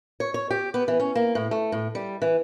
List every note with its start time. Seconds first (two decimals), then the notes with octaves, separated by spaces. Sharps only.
0.20 C#5
0.34 C#5
0.51 G4
0.74 B3
0.88 E3
1.00 C#4
1.15 A#3
1.35 A2
1.51 A3
1.72 A2
1.95 G3
2.22 E3